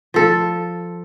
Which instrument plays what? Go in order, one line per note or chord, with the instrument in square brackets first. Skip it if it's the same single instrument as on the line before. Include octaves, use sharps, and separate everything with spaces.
[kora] F3 A4